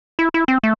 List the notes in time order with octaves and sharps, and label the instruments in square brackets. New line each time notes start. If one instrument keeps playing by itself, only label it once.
[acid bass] E4
E4
C4
A3